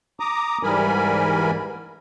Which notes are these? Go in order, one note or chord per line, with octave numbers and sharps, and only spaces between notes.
A#5 D6 D#6
G#2 E3 G3 A#4 G#5 B5